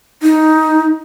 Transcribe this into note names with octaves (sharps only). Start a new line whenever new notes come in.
D#4